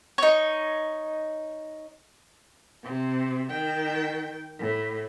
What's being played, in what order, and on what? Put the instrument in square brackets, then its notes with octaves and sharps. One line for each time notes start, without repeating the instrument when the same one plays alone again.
[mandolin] D#4 C#5
[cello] C3
D#3 G5
A2